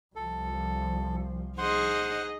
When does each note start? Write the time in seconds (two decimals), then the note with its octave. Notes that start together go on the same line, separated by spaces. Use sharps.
0.15 C2 F3 A4
1.58 D#4 G#4 C5 D#5 F#5 C6